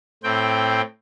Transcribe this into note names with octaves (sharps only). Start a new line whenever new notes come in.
A2 C4 G5